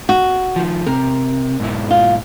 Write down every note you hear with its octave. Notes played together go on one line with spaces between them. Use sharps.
F#4
D#3 F3
C3 A#4
G#2 B2 E4
F4